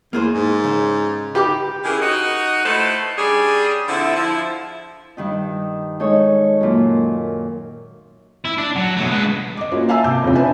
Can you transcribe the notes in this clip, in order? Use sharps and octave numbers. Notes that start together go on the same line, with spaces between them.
E2 A#3 G#4 C5
G#2
C#3 C5
D#4 G4 B4 D6
C#3 E3 E4 G4 G#4 A#4
D#4 F#4 D#5
A3 E4 F4 A4 B4 C5
G3 C#4 D4 G#4
D3 F3 C4 E4
F3 E4
G2 D#3 D#4
G#3 D#4 A4 C#5
F#2 A#2
E4
D4
F#3
B2 A3
G#3 B4
D#5 D6
A#3 C#4 F4 F#4
E5 F5 G#5 A5 E6
C3 D6 G6
F2 C#3 C4 C#4 F4
D4 B4 E5 G#5 A5 B5